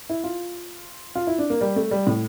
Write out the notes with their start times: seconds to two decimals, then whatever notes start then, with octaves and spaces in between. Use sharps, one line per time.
0.10 E4
0.24 F4
1.16 F4
1.27 E4
1.38 D4
1.50 A#3
1.61 G3
1.76 A3
1.91 G3
2.07 A2